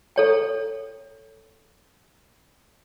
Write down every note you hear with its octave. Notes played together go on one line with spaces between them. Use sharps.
A4 C#5 G5